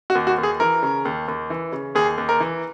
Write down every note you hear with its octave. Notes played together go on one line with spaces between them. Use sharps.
F#4
D#2
F#4
D#2
G#4
E3 A#4
C#3
D#2
D#2
E3
C#3
D#2 G#4
D#2
A#4
E3